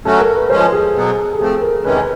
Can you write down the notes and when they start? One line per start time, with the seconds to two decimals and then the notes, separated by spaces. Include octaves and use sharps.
0.05 F#3 A3 C#4 F#4 A4
0.20 A#4
0.35 B4
0.50 F3 G#3 C#4 C5
0.73 G#4
0.95 B2 F#3 B3
1.33 A4
1.39 F3 A3 C4 G#4
1.62 A#4
1.84 E2 C3 D#3 G#3 C#4 B4